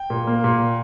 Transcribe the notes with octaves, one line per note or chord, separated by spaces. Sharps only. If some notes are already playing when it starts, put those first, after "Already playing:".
Already playing: G5
A#2
A#3
A#2